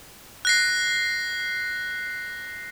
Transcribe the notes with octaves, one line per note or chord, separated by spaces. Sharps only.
F#6 A#6 C7